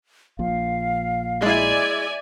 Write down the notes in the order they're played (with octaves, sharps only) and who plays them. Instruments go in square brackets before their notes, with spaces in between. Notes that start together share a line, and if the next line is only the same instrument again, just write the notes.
[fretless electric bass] A#1 A#2 F3 [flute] F5
[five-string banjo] G#3 E4 [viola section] D5 E5 G#5